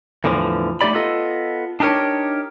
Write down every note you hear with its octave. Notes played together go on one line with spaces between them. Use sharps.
E2 A2 D3 E3 F3
A3 D#4 G4 D5 B5
B3 F4 A4 D#5
D4 D#4 G4 A#4 C#5